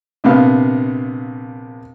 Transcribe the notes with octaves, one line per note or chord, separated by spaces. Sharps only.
A#1 C3 B3 F5